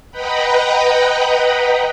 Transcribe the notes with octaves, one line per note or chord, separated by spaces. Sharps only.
B4 D#5 F#5 G5 A#5 B5